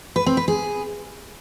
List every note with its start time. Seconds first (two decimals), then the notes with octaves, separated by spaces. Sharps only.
0.16 B4
0.26 C4
0.37 B4
0.48 G#4